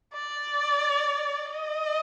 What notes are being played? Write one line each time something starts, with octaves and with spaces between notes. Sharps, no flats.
D5
D#5